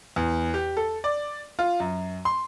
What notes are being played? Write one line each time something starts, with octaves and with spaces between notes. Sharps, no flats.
E2
G4
A4
D5
F4
F#2
C6